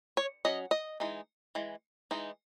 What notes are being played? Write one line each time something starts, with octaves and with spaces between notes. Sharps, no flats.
C#5
F#3 C#4 D#5
D#5
E3 G#3 D#4
E3 G#3
E3 G#3 D#4